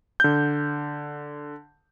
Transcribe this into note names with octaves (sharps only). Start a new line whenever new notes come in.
D3 G6